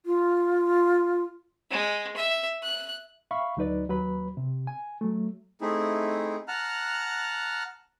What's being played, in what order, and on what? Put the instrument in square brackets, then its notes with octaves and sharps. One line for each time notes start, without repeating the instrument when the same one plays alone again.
[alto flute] F4
[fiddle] G#3
E5
F#6
[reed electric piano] E5 F5 B5 C#6
D2 F#3 D#4 B4 D5
D#2 F#3 B4 B5
C3
G#5
F#3 A3
[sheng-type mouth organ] A3 C4 D#4 E4 G#4
F#5 A5 A#5 F6 F#6